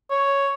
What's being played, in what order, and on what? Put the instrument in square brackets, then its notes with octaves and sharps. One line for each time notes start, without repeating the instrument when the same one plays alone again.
[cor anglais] C#5